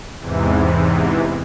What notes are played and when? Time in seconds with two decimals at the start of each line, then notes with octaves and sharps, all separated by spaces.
0.19 E2 G#2 C3 E3